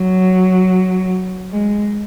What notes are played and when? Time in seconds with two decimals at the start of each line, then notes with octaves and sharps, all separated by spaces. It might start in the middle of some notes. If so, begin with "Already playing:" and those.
Already playing: F#3
1.52 G#3